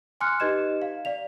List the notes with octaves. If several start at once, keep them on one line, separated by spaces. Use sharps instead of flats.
G#5 C6 D6 F6 F#6 C#7
D#4 G4 B4 D#5 G#6 E7
F5
D5 F5 F7